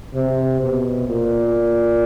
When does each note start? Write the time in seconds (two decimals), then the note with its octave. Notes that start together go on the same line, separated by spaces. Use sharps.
0.14 C3
0.61 B2
1.07 A#2